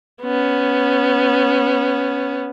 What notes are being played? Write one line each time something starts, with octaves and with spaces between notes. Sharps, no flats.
B3 C#4